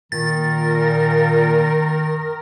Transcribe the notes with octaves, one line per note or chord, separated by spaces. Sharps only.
A#2 D#3 A#4 A6